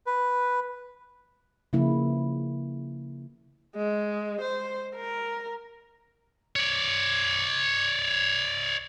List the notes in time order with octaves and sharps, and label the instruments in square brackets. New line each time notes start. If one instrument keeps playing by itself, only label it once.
[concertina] B4
[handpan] C#3 F3 A#3 E4
[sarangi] G#3
C5
A#4
[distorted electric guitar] C#5 D5